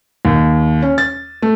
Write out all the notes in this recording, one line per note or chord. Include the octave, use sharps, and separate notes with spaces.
D#2
C#4
A6
A3